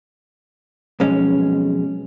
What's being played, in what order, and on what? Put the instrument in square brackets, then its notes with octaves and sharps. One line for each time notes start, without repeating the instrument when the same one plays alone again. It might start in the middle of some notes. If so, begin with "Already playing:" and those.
[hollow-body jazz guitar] B1 F2 G#3 C#4